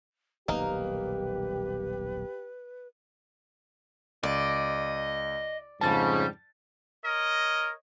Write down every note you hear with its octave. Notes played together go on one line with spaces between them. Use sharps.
D#1 B1 A#3 D#4 G4 B4
C#2 D5 D#5
F2 G#2 C#3 G3 A5 A6
A#4 C#5 D#5